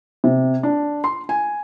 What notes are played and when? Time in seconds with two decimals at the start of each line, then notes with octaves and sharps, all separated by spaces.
0.24 C3
0.63 D4
1.04 C6
1.29 G#5